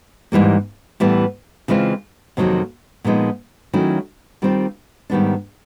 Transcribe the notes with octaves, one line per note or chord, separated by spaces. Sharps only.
G#2 E3 G3 A#3
A2 E3 G3 B3
C#3 E3 G#3 C4 F4
F2 C3 D#3 F#3 A#3
A#2 F3 G#3 B3 D#4
D#3 F#3 A3 C#4 E4
D#3 G3 C4 F4
G#2 D#3 G3 B3 D4